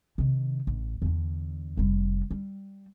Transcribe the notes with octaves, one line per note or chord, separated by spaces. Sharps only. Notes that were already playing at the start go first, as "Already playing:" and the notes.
C3 D#3
A1
E2 D3
F1 G3
G3